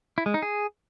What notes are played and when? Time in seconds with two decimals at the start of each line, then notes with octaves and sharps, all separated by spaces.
0.18 E4
0.26 G#3
0.34 D#4
0.42 G#4